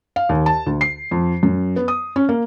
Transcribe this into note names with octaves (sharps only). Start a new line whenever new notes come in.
F5
D#2
A5
D2
C7
F2
F#2
B3
D#6
C#4
A#3